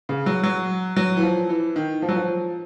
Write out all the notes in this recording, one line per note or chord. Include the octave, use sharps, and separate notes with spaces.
C#3
F#3
F#3
F#3
E3
F3
E3
D#3
F3
F#3
F3